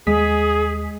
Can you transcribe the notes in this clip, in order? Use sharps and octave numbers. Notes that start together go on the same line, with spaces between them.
D#2 G#3 G#4 D#6 B6